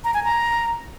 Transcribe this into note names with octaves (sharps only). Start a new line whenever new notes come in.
A#5
G#5
A#5